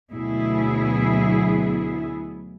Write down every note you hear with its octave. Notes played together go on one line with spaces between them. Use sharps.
D2 B2 F#3 B3 E4 G#4